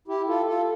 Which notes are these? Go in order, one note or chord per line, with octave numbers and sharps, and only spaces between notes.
E4 G4
F4 A4
F4 A4